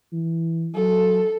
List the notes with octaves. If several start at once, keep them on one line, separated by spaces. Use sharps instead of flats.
E3
F#3 A4